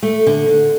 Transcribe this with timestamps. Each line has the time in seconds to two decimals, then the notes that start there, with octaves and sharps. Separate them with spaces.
0.03 A3
0.27 D3
0.49 D3